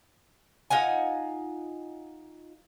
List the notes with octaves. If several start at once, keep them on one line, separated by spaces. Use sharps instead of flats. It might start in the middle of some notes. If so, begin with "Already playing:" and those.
D#4 F4 F#5 G#5